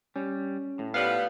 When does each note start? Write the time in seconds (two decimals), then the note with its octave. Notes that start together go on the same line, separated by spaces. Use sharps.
0.16 G3 C#4
0.79 A2
0.94 F3 G3 B3 F5